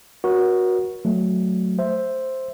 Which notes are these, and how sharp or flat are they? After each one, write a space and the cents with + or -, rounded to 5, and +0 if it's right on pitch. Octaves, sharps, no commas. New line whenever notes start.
F#4 -5 A#4 +40 C#5 +15
F#3 +0 A3 +0
C5 +0 E5 +0